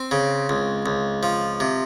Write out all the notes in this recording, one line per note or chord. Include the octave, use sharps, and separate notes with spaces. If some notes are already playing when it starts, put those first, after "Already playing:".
Already playing: C4 C5
C#3
C#2
C#2
F3
C3